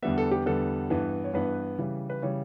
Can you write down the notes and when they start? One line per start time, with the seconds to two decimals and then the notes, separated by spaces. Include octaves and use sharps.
0.02 E2 D3 G3 B3 E5
0.18 A4
0.31 G4
0.46 E2 D3 G3 B3 A4
0.90 G2 E3 B3
1.24 C#5
1.34 G2 E3 B3 B4
1.78 C#3 E3 G3
2.10 B4
2.22 C#3 E3 G3 C#5